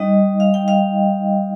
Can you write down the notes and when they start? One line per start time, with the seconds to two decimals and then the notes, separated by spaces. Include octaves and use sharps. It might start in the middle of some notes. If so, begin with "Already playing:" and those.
Already playing: G3 D#4 D#5
0.40 F5
0.54 G5
0.68 F5